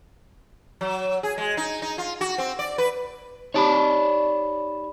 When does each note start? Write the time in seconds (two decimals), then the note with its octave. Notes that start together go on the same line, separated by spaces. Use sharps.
0.81 F#3
1.23 G#4
1.38 G#3
1.57 D#4
1.82 D#4
1.98 F4
2.21 F#4
2.38 C4
2.59 D5
2.78 B4
3.54 D#4 G4 C#5 D5 A5 B5